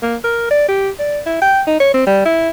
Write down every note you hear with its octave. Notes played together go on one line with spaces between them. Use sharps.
A#3
A#4
D5
G4
D5
E4
G5
D#4
C#5
C4
G3
E4